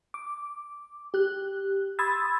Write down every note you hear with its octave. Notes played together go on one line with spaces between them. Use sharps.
D6
G4 F#6
B5 C6 D#6 E6 G#6 A6